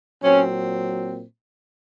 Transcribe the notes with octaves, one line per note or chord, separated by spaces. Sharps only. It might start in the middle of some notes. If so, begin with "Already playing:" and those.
A#2 F#3 C4 C#4